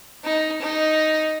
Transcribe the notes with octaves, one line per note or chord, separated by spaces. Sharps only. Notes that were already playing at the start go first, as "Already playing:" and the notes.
D#4
D#4